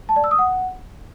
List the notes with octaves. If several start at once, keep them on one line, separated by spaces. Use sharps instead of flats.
A5
D5
E6
D#6
F#5